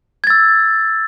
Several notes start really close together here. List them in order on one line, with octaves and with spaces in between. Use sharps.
G#6 A6 E6